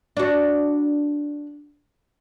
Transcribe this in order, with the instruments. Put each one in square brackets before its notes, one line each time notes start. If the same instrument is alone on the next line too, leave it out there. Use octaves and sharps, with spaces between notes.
[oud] D4 F#4